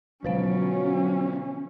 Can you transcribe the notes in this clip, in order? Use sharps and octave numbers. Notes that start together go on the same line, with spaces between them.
B2 D3 F3 F#3 C#4 C5 F5